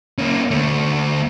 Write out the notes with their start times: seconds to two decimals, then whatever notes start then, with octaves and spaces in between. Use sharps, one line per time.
0.18 A#3 C#4
0.51 D2 A3